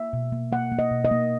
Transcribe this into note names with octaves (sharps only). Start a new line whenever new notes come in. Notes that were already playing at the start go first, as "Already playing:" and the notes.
Already playing: A#3 E5
B2
A#3
A#3 F#5
A#3
D#5
B2
D#5
A#3